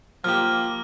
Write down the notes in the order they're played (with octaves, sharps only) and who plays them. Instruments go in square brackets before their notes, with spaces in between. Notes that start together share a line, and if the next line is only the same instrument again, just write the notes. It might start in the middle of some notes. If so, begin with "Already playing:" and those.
[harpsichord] F3 G4 [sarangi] A#3 [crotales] F6